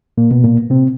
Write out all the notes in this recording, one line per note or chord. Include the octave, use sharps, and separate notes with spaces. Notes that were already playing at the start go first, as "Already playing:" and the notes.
A#2 A#3
B2 B3
A#2 A#3
C3 C4